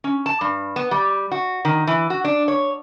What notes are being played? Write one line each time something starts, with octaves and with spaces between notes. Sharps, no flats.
C#4
A5
G2
B3
G3
F#4
D#3
E3
F#4
D4
C#5